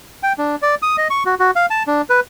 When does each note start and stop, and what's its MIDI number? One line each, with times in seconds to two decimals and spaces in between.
0.23 0.33 79
0.38 0.56 62
0.62 0.75 74
0.82 0.96 87
0.98 1.08 75
1.10 1.23 85
1.26 1.35 66
1.40 1.51 66
1.56 1.66 77
1.70 1.83 81
1.87 2.02 62
2.10 2.20 71